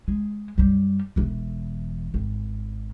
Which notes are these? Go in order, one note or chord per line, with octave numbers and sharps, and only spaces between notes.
G#3
F#2 G3
E1 E3
G#1